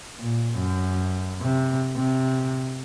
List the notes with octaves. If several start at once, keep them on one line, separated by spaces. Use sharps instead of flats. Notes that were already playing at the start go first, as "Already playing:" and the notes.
A#2
F#2
C3
C3